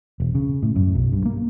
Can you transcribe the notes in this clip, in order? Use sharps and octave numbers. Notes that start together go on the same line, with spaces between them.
E1
C#3
A2
F#2
B1
G2
A#3